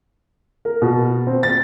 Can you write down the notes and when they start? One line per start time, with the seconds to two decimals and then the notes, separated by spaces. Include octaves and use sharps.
0.65 A#4
0.82 B2
1.27 C4
1.43 A6